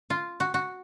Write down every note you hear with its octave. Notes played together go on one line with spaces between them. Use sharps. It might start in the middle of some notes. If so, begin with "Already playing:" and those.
F4
F#4
F#4